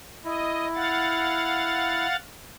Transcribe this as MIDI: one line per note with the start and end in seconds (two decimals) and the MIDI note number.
0.25 2.07 64
0.25 0.68 75
0.75 2.16 77
0.75 2.16 78
0.75 2.16 93